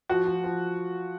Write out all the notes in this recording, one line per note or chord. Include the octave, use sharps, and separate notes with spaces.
F3 F#4
F3
F3